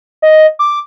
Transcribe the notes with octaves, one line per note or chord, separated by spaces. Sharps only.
D#5
D6